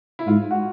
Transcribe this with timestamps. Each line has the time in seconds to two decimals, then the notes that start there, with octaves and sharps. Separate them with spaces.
0.19 E4
0.27 G#2 F4
0.51 F#4